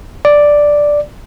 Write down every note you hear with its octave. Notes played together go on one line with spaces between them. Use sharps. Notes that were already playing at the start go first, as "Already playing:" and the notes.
D5